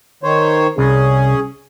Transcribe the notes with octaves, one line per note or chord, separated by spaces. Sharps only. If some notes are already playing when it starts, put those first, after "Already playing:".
D#3 C5 C#5
C2 C#4 G#4